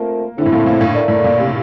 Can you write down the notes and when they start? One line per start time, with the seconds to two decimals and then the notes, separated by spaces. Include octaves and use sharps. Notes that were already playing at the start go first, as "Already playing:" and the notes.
Already playing: A3 A#3 C4 F4 A#4
0.37 D3 A3 C4 E4
0.46 A2
0.53 A#2
0.66 A#2
0.81 A2
0.96 A3 E4 A#4 D5
1.08 A2
1.24 A#2
1.40 C3